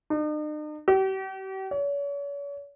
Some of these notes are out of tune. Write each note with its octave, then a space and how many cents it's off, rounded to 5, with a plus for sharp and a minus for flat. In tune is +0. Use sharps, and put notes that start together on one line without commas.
D#4 -45
G4 -40
C#5 +40